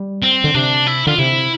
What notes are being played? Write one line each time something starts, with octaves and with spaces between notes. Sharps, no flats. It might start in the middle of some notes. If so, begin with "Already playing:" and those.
Already playing: G3
C4
D3
C3 D4
E4
D3 F4
C3 E4